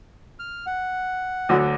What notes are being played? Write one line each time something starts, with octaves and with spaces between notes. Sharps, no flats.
F6
F#5
D2 D3 F#3